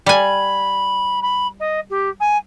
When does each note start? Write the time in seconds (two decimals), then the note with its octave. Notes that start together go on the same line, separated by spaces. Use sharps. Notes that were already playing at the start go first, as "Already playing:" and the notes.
0.06 G3 G#5 B5
1.22 B5
1.60 D#5
1.90 G4
2.20 G#5